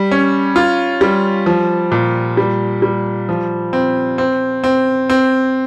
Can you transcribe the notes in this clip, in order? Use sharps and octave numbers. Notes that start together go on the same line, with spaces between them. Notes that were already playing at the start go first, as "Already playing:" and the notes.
Already playing: G3
C#4
F4
G3
F3
A#2
G3
G3
F3
C4
C4
C4
C4